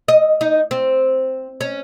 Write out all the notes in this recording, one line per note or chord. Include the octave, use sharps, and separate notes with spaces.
D#5
D#4
C4
C#4